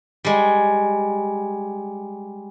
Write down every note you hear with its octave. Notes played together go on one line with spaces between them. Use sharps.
G3 G#3